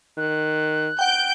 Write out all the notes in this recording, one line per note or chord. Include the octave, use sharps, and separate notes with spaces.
D#3 F#6
F#5 G5 G6 D7